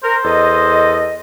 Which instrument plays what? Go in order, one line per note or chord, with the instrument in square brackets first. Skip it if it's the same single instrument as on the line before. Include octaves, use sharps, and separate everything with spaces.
[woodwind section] A#4 [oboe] C5
[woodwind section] E2 A4 D#5